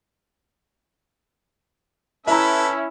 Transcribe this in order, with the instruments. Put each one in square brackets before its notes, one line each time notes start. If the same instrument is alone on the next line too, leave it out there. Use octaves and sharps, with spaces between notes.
[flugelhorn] C#4 [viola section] E4 [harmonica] A4 B4 [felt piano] E5 A#5